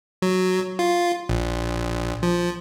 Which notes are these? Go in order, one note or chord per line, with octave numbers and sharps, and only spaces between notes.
F#3
F4
A#1
F3